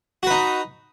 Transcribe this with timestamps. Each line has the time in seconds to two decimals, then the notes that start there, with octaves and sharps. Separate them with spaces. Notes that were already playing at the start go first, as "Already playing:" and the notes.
0.23 F#4
0.27 B4
0.31 D#4